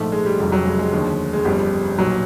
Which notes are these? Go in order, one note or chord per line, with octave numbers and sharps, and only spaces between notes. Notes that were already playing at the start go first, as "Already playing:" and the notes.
Already playing: A#1 G#2 F3 A3
G#3
G3
F1 F2 C#3 F#3 G3
F#3
G#3
G#3
D#2 D3 F3
G#3
G1 F2 C#3 G3
B1 A#2 F#3